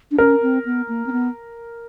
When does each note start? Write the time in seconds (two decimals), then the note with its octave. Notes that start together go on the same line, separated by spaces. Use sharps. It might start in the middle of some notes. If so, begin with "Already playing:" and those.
0.11 D4
0.18 C#4 A#4
0.42 C4
0.65 B3
0.89 A#3
1.07 C4
1.12 B3